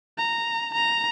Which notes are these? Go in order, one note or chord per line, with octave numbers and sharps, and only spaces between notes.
A#5
A#5